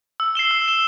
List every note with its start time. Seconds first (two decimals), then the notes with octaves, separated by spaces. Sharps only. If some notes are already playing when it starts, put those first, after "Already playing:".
0.20 E6
0.35 C7 E7 G7
0.51 E6
0.66 C7 E7 G7